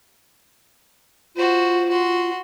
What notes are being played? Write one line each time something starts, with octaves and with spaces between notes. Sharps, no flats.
F4 F#4 C5
F#4 C6